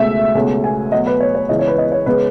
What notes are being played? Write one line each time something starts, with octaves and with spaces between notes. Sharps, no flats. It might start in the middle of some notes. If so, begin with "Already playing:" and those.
Already playing: C#2 B2 A3 E5
C#2 B2 A3 C#4
G#5
B2 F#3 A3 D#5
B4
C#5
C#5
C#2 C#3 E3 B3 D#5
C#5
B4
D#5
C#5
C#3 G#3 B3 B4